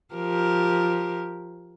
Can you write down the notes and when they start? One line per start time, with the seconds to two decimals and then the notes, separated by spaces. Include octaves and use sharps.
0.15 F3 G4 A#4